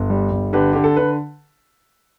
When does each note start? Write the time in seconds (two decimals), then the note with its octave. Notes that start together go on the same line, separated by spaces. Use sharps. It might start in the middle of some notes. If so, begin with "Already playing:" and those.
Already playing: G1
0.10 G3
0.31 G1
0.53 D3 G4 B4
0.73 D3 G4
0.84 A4
0.96 D3 B4